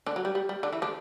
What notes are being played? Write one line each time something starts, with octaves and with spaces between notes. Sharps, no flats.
D3 D4
F#3
G3
G3
G3
D3 D4
E3 E4
D3 D4